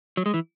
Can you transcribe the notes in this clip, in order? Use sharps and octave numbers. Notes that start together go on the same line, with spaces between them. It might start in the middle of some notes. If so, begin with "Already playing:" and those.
F#3
G#3
E3